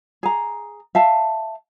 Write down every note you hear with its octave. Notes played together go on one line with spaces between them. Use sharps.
G#4 A#5
E5 F5 A5